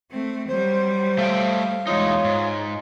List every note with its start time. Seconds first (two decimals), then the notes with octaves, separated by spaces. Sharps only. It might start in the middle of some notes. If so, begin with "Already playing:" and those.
0.11 A3 C4
0.48 F#3 G3 C5
1.19 A3 F5 G5
1.87 E2 G#3 D#4 F4 C#5
2.25 G#2